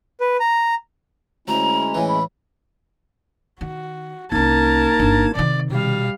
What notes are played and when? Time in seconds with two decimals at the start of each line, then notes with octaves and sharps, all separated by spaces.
0.21 B4
0.40 A#5
1.48 D2 G#3 C#4 E4 A#5
1.94 A2 E3 G#5
2.08 B5
3.61 D#3 F#4
4.32 C2 A#3 C#4 D#4 A#4 A5 G#6
4.99 G1 D3
5.35 C3 D#3 D5
5.70 B2 G3 F5